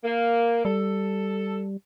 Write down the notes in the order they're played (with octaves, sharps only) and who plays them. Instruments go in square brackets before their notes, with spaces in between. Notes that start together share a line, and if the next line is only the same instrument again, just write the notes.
[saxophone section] A#3
[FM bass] G3 [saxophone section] A4